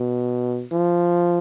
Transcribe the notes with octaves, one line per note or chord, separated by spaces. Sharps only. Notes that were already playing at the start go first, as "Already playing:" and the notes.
Already playing: B2
F3